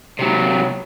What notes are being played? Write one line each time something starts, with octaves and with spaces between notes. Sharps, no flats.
C3 F#3